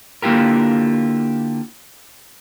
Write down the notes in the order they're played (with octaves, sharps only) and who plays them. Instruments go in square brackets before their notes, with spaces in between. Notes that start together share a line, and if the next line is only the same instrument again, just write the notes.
[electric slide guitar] D3 A#3 E4 F4 G4 A#4